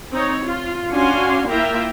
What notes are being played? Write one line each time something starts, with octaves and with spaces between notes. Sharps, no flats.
C4 D#4 C#5
F4
C#4 D4 F#4 F5 G#5 C6
A#3 E4 F4 E5 G5 A#5